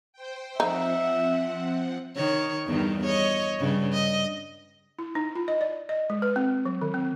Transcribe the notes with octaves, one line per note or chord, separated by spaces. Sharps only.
C5 G5
F3 C4 D#4 E5 F#5
D#3 C#5
E2 G2 D#3
C#5 D#5
G2 C#3
D#5
E4
D#4
F4
D#5
D5
D#5
G#3
B4
C4
F#3
D#3
C4